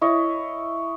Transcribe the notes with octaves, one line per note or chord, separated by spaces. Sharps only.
E4 C#5 D#5